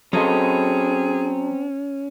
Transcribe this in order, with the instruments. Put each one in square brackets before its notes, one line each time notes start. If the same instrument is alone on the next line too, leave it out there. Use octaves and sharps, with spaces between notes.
[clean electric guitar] F#3 A4 D#5 [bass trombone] C4 [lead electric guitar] C#4 [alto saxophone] G#4